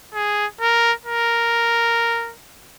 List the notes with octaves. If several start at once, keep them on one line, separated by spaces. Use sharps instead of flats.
G#4
A#4
A#4